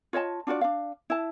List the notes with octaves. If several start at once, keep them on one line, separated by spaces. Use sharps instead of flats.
F4 C#5 D#5 A5
D4 F4 F#4 D5
D4 F5
E4 A5